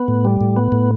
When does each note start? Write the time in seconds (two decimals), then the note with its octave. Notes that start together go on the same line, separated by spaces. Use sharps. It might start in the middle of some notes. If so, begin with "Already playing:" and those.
Already playing: B3
0.08 A2
0.25 G3
0.41 A2
0.56 B3
0.72 A2